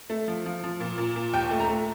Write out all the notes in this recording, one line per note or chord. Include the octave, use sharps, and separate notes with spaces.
A3
F3
F3
F3
A#2
A#2
A#2
D#2 G5
A3
A#5
A3